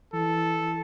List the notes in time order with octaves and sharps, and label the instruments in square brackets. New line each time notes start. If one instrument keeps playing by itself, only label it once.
[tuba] E3 [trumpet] A4